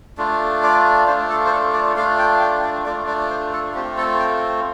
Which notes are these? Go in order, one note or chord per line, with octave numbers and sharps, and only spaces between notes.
A3 D4 F4
D5
A3 D4 F4 C5
A4
C5
A4
D5
A3 D4 F4 F5
G5
G5
D5
A3 D4 F4 D5
D5
C5
A4
A3 C4 F4 G4
A4
G5